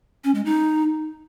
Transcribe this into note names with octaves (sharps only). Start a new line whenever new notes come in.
C#4
G#3
D#4